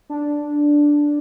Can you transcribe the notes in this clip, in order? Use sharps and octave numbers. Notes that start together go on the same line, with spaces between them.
D4